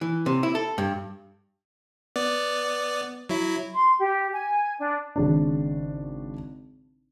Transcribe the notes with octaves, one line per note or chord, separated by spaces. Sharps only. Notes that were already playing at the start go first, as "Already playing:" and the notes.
E3
C3
E4
A4
G2
B3 D5
F#3 E4
C6
G4
G#5
D4
G#1 C#3 D4